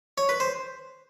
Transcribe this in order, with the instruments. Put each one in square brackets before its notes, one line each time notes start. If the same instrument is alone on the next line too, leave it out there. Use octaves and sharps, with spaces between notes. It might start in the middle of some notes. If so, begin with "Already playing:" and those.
[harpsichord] C#5
B4
C5